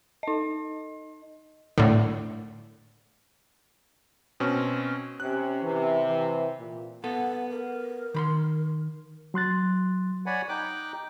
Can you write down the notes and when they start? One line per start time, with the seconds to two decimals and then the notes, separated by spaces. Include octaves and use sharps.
0.23 D#4 D#5
1.78 A2 D3
4.40 B2 C4 C#4
5.20 C3 C#4 F#6
5.63 C3 E3
6.07 E3
6.59 A#2
7.04 B3 A4 F#5
7.50 A#4
8.14 D#3 B5 C6
9.34 F#3 C6 F#6 A6
10.26 C#5 D5 F#5 G#5 B5
10.49 D#4 G5 D6 F#6